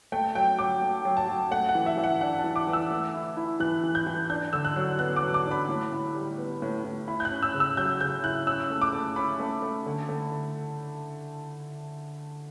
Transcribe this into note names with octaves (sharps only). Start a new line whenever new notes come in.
A3 G5
F#3 G5
F#3 D6
A3
F#3
A5
F#3
A3 F#5
F#5
E3
E5
E3 E5
F#5
D4 F#5
A5
E3
D6
E3
E6
A3
E4
E4
E3 F#6
E3
G6
E3
D4 G6
D3 E6
F#6
F#3
B3 F#6
D6
F#3
D6
D4
B5
A2
A2
G3
B3
A2
A2
E4 B5
G6
F#6
C#4
E6
C#3
E6
F#3 G6
C#3 G6
E4 F#6
C#4 E6
A3
D6
A3
C#4 B5
A3
A3
D3
A3
D3